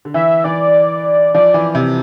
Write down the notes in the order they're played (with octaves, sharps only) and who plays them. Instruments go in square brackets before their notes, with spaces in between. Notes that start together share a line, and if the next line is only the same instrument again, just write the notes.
[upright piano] D3
[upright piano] E3 [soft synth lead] E5
[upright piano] E3 [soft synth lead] D5
[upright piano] F3 [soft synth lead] D5
[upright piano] E3
C3